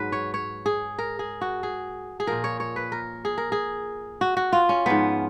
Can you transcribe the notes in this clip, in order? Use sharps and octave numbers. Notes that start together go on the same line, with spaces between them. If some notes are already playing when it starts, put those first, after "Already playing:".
Already playing: G#2 F#3 B4
C#5
C#5
G#4
A#4
G#4
F#4
G#4
G#4
A#2 F3 A#4
C#5
C#5
B4
A#4
G#4
A#4
G#4
F#4
F#4
F4
C#4
G#2 F3 B3